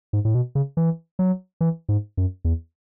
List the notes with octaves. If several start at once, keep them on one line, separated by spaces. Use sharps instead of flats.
G#2
A2
B2
C#3
E3
F#3
E3
G#2
F#2
E2